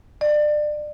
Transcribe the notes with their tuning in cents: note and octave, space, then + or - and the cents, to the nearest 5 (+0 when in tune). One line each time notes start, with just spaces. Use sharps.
D5 +25